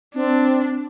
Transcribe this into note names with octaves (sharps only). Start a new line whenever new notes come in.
C4 D4